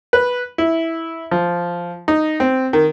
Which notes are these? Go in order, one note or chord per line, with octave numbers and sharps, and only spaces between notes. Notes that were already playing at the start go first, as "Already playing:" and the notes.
B4
E4
F3
D#4
C4
D#3